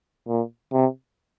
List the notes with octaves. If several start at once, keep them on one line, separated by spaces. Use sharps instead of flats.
A#2
C3